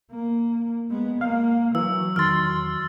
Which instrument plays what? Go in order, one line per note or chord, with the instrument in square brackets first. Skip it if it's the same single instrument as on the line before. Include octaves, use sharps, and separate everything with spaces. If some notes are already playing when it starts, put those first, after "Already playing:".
[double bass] A#3
G#3 B3
[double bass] A#3 [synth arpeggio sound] F5
[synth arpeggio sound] E3 [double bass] F#3 [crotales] E6
[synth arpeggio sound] E2 D#3 C6 [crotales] F6 A6